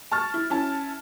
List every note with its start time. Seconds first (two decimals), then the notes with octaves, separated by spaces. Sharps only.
0.11 A5 C#6 F6 A6
0.34 E4
0.50 C#4 E4 A5